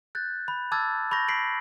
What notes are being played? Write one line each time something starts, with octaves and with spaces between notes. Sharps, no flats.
F#6 G6 A6
B5
A5 D6 E6 F6 G#6 A6
B5 C#6 G6 A#6
B6 C7 D7 F#7